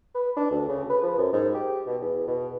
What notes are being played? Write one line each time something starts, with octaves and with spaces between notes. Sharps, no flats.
B4
D4
D2
C#3
B4
F3
F#2
G#2
G4
B2
E2
B2